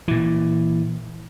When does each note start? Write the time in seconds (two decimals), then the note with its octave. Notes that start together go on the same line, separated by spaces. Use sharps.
0.08 A#2 E3